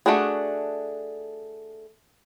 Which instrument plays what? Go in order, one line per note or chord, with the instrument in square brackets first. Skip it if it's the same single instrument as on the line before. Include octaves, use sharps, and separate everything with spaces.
[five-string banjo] A3 D4 F#4 G#4